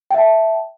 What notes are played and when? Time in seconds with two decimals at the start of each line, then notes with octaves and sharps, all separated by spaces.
0.11 G5
0.14 E5
0.18 A5